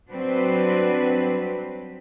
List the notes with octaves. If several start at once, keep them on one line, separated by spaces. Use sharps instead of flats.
F#3 G3 C4 D4 B4